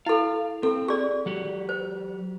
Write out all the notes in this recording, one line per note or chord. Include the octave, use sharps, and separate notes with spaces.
E4 A4 F5
C4 A4
G#4 D5
F#3 F#4 G4
C5